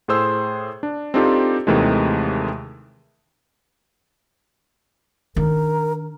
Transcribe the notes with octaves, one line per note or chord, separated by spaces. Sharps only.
A2 G#4 C5 E6
D4
C4 D4 D#4 F4 G4 A4
D#2 C3 D#3 E3 G#3 A3
D#3 D4 A#4